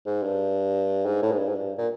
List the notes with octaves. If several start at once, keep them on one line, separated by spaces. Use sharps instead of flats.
G#2
G2
G#2
A2
G#2
G2
G#2
G2
A#2